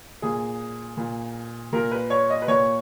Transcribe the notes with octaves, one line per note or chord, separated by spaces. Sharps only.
A#2 G#4
A#2
A#2 A#4
B4
C#5
D#5
B4
A#2 C#5